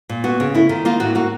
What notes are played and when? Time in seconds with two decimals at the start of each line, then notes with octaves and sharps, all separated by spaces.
0.09 A#2
0.24 B3 F#4
0.40 C#3
0.54 A3 E4
0.69 D#3 F4
0.85 A#3 F4
1.00 A2 F#4
1.15 A#3 F#4